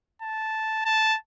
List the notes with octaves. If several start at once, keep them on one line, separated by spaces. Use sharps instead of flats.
A5
A5